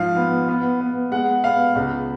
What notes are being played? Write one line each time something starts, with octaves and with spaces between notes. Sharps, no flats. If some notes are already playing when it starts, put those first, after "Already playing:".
Already playing: G#2 F3 F5
B3
B3
B3
G#3 F#5
B3 F5
C#2